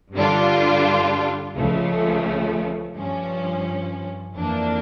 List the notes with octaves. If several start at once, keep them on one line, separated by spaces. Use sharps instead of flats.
G2 D3 G3 D4 F4
C#2 C#3 F3 A3
G2 F3 C#4
F2 E3 A#3 D4